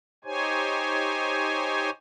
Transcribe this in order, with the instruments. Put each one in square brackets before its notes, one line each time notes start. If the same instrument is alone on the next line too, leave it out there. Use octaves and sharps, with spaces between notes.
[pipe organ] D#4 G4 C5 C#5 G#5